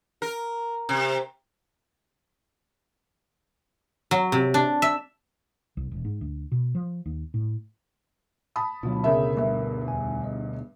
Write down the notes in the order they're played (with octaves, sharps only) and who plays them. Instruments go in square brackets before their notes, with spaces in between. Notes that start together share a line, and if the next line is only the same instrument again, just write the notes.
[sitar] A#4
C3
[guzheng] F#3
C3
D4
E5
[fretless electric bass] C2
E1
G#2
D2
B2
F3
D#2
A2
[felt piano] A5 B5 D#6
[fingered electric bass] D2 B2 [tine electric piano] F#3 F4
[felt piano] C#3 E5 [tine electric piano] A4 A#4 B5
[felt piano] G2 E5
[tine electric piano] E2 G#5
D#5